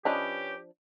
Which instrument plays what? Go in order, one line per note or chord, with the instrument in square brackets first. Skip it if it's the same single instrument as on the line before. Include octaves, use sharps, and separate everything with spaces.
[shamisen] F3 D4 [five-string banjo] C#4 B4 D#5 [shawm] G4